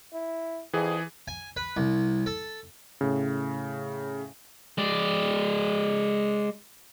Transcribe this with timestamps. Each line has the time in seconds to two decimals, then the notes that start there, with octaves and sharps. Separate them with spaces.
0.13 E4
0.73 F2 E3 G#4
1.28 G#5
1.57 B4
1.77 C2
2.26 A4
3.01 A2 C#3
4.78 G#3 D5